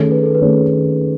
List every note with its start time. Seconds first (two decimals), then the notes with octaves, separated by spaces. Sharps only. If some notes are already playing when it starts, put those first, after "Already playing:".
Already playing: D#3 A3 C#4 G#4 A4 C#5
0.11 B4
0.23 A4
0.35 B4
0.41 D#3 A3 C#4 G#4 C#5